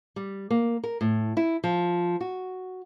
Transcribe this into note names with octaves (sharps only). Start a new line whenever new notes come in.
G3
A#3
A#4
A2
E4
F3
F#4